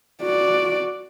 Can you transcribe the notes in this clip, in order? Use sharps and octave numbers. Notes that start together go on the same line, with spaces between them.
F#4 D5